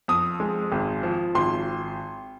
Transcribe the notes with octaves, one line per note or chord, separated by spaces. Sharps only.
F2 D#6
G#3
G#1
F3
G#1 C6